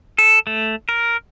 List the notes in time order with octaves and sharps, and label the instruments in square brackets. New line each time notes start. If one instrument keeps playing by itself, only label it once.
[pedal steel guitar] A4
A3
A#4